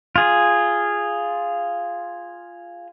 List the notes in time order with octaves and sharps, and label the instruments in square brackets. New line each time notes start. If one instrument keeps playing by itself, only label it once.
[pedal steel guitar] F4 G#4